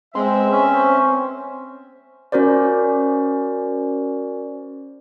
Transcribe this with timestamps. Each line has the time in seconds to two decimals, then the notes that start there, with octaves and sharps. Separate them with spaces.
0.15 G#3 B3 C4 C5 E5
0.51 C#4
2.32 C#4 F#4 A#4 C5 D5